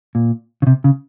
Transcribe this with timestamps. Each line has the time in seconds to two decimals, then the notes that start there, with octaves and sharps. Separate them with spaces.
0.15 A#2
0.62 C#3
0.67 C3
0.84 C#3